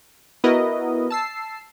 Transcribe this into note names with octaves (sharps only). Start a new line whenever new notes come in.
B3 E4 F#4 A#4 B4 D#5
A5 E6 C7